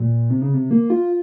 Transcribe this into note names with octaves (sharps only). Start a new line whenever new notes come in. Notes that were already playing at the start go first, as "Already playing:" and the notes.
Already playing: A#2
C3
C#3
C3
A#3
F4